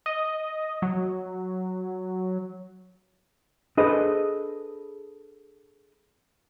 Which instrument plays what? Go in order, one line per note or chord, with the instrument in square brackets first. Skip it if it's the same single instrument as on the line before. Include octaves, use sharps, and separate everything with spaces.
[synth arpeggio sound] D#5
F#3
[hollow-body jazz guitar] D4 G#4 A4 B4 C5 D#5